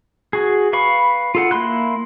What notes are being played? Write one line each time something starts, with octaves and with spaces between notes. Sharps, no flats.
F#4 G#4
B4 F5 B5 C#6
F4 A4 F#5
A#3 E4 B5 C6 F#6